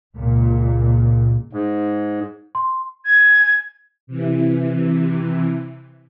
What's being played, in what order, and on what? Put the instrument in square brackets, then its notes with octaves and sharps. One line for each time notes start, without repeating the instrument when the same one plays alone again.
[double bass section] C#2 A#2
[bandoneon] G#2
[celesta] C6
[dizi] G#6
[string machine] C3 E3